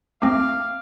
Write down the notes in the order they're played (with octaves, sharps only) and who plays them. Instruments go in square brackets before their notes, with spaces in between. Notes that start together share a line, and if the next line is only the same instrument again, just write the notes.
[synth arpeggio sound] A3 C4 [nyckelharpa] F5 [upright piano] D6